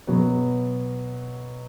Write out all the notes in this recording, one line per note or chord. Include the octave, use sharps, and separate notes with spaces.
B2 F#3 B3